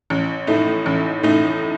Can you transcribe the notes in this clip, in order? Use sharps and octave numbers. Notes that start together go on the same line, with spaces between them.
A1
A2 A3 D#4
A1
A2 A3 D#4